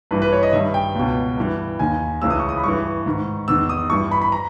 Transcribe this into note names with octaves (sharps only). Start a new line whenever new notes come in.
G2 E3 B4
B4
C#5
D#5
G2 D#3 E5
G5
C#2 B2
G2 E3
D#2 D#3 G#5
C#2 C#3 E3 E6
D#6
C#6
D#6
B5
G2 E3 C#6
G#2 D#3
E2 D#3 E6
D#6
G2 E3 C#6
B5
B5
A#5